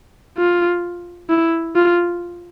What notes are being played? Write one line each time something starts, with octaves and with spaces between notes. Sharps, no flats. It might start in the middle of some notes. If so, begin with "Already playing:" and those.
F4
E4
F4